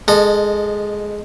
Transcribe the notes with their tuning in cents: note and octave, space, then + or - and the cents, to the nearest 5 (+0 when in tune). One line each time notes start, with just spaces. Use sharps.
G#3 +0 A4 +0 D#5 -25